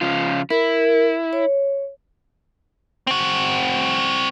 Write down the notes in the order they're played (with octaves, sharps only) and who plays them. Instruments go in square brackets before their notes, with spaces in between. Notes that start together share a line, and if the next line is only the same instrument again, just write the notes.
[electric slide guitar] C#3 F3 F4
[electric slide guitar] E4 [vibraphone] A#4
[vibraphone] C#5
[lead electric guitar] C4 F#4